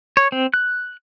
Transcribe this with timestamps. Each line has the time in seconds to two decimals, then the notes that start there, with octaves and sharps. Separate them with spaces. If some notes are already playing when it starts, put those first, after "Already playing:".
0.17 C#5
0.32 C4
0.54 F#6